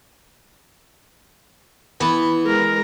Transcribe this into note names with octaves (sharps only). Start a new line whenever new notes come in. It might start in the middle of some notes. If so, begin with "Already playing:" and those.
E3 B3
G#3 A#4